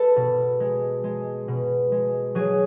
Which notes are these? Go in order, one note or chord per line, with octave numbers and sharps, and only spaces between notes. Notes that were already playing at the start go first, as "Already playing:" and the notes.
Already playing: G#3 A4 B4
B2
G#3
G#3
B2
G#3
F#3 G#4